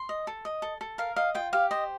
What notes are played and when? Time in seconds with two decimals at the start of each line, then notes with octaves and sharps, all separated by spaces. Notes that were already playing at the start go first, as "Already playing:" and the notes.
Already playing: C6
0.09 D#5
0.27 A4
0.45 D#5
0.62 A4
0.81 A4
0.98 A#4 F5
1.16 D#5 F5
1.35 F4 G5
1.53 G4 F5
1.71 C5 D#5